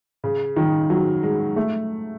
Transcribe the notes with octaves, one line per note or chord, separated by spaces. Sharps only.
C#3
D#3
F#3
G#3
A3